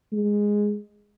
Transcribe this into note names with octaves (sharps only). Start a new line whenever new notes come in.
G#3